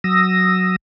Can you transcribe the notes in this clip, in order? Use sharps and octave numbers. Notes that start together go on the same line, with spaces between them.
F#3 D#6 E6 A#6